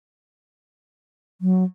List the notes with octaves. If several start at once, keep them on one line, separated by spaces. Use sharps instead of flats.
F#3